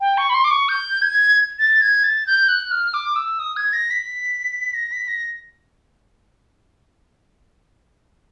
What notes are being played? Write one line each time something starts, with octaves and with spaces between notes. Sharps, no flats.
G5
C#6
B5
C6
D6
C#6
G6
G#6
A6
G#6
A6
G6
F#6
F6
D6
E6
D#6
G#6
A#6
B6
A#6
B6
A#6